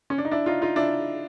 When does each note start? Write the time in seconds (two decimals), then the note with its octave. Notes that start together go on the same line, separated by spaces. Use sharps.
0.10 C#4
0.18 D4
0.25 D#4
0.31 D4 E4
0.46 D#4 F4
0.62 D#4 F4
0.76 D4 E4